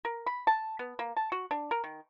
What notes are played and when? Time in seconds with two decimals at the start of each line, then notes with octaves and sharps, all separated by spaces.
0.05 A#4
0.26 B5
0.47 A5
0.79 B3
0.99 A#3
1.17 A5
1.32 F#4
1.51 D4
1.71 A#4
1.84 D#3